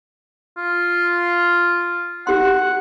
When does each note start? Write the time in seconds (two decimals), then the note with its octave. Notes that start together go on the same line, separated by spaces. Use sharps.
0.57 F4
2.27 F#4 G4 F#5 C6